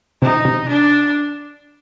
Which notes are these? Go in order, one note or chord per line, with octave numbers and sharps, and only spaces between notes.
C3 D#4
C3
D4